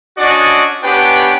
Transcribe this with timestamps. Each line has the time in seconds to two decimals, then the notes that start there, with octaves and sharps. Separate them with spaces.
0.17 C#4 D4 F#4 D5 D#5 F#5
0.83 B3 C#4 D4 G4 B4 G5